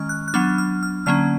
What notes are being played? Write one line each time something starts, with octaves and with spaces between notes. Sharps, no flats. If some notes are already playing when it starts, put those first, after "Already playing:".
Already playing: D#3 G#3 C#4 C#6 F6
F#6
F#6
F#3 B3 D4 F6
F6
F6
D3 F#3 A#3 C#4 F6